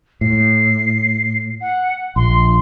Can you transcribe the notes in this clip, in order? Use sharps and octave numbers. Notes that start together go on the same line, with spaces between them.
A2 C7
F#5
A#1 C6